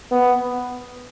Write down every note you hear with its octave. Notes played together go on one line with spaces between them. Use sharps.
B3